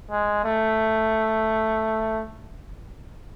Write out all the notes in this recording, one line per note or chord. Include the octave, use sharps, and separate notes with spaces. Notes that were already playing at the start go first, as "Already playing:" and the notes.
G#3
A3